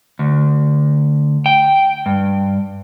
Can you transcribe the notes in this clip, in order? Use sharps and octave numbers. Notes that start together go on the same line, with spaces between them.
D2
G5
G2